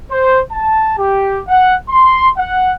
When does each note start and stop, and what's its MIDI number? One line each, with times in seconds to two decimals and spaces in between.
0.11 0.40 72
0.50 0.97 81
0.97 1.40 67
1.48 1.75 78
1.89 2.28 84
2.36 2.73 78